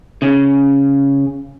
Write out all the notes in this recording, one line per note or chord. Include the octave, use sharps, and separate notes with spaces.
C#3